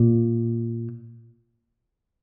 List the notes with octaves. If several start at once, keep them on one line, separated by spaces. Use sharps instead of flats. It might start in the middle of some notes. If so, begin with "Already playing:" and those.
Already playing: A#2